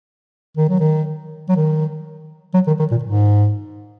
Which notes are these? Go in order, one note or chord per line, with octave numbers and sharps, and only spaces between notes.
D#3
F#3
D#3
F#3
D#3
F#3
D#3
D#3
A#2
G#2